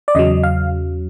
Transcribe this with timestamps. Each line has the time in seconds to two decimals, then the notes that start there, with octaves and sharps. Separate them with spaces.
0.08 D5
0.15 E2 C#3 F#3 D#5
0.43 F5